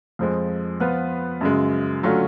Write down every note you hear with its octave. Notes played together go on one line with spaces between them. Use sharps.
F2 F3 G#3
F3 B3 F4 B4
F#2 C#3 G#3
D3 F#3 A3 C#4 F4